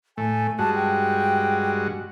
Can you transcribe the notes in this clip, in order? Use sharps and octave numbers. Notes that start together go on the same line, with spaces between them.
A2 A3 G#5
G2 G#3 F#4 A5
G5